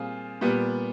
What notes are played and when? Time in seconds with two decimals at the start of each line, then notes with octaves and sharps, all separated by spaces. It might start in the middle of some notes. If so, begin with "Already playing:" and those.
Already playing: A#2 G3 C4 F4 G#4
0.41 A#2 G3 B3